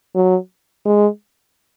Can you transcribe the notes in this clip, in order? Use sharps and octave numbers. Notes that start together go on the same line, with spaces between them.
F#3
G#3